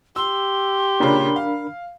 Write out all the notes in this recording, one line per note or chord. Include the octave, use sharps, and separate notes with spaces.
G4 C6 E6
A#2 C#3 D4 A#4 B5
F5